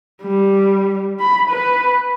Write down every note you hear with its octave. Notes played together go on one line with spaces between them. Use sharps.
G3
B5
B4